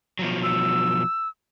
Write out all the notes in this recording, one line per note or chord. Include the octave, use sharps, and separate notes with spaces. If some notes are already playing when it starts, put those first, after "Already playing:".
B2 F3 F#3
E6